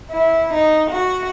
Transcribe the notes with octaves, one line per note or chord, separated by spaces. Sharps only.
E4
D#4
F#4